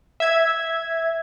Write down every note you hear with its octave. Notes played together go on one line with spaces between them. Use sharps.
E5 G#6